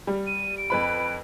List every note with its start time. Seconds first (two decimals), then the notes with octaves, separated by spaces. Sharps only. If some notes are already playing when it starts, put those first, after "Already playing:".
0.07 G3
0.27 D#7
0.58 D7
0.70 F2 B4 B5